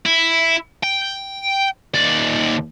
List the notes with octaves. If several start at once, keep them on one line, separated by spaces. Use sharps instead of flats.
E4
G5
D#2 D5